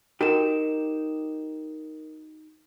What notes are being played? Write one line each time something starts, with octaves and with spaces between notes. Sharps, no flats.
D#4 F#4 G4 A#4 E7